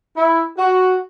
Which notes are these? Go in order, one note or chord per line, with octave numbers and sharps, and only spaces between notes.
E4
F#4